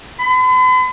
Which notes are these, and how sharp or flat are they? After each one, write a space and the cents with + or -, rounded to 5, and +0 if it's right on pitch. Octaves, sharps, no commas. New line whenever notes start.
B5 +45